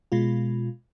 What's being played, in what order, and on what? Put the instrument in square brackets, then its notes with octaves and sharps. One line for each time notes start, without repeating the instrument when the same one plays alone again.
[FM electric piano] B2 G#3 F4